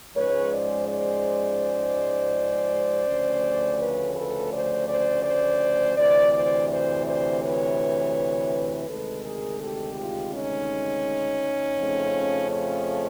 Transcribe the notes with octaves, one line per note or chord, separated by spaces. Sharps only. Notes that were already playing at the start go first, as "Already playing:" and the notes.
G#2 F3 G#3 C#4 B4 C#5
C5 D5
C5 D5
D2 C#3 F3 A3 C#4
B4 C#5
A4 B4
C5 D5
C5 D5
C5 D5
D2 C3 E3 C5 D5
C5 D5
C5 D5
C5 D5
B4 C#5
D2 C3 D#3 G#3 A4 B4
G#4 A#4
G4 A4
F4 G4
C#4 D#4
F2 C#3 F3 A3
C#4